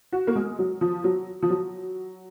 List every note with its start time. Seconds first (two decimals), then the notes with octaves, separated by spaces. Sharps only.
0.13 F#4
0.27 A#3
0.36 G#3
0.59 F#3
0.81 F3
1.04 F#3
1.43 F3
1.50 F#3